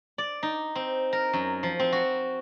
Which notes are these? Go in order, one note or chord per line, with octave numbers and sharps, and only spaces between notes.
D5
D#4
C4
A#4
F#2
F3
C4
F#4